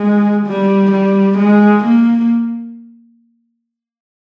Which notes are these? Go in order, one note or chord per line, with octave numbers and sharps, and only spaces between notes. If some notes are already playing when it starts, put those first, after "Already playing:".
Already playing: G#3
G3
G3
G#3
A#3